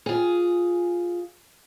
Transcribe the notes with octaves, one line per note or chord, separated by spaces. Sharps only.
F4 G#4